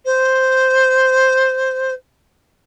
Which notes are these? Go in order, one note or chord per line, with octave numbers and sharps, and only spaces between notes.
C5